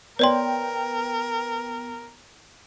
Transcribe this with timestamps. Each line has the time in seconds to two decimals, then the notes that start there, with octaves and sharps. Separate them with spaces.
0.19 B3 A#4 C#5 D5 G5 C6